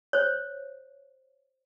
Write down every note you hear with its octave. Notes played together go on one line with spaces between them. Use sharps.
C5 C#5